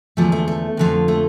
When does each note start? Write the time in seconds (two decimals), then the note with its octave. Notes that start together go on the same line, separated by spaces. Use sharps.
0.17 E2 D3 F3 A3
0.32 A3
0.48 A3
0.77 F2 D3 F3
1.08 A3